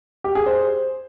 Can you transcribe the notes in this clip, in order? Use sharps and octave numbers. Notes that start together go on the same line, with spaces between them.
G4
G#4
C5